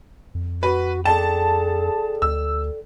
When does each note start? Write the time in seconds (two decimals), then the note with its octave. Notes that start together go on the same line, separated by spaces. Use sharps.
0.35 F2
0.63 F#4 B4
1.05 G#4 A4 D5 G5 A5
2.22 D2 E6